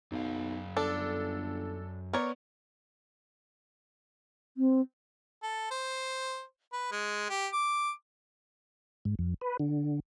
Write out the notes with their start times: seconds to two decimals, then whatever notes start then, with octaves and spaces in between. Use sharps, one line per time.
0.12 B1 F#2 F5
0.77 G1 D4 A4
2.13 B3 A#4 C#5 D5
4.57 C4
5.43 A4
5.71 C5
6.73 B4
6.92 G#3
7.30 G4
7.53 D6
9.05 G#2
9.19 F2
9.41 B4
9.60 D3